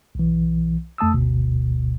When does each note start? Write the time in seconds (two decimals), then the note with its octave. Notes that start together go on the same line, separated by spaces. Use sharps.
0.15 B1 E3
0.98 F2 A3 A5 D#6 E6
1.14 G1 D2 B2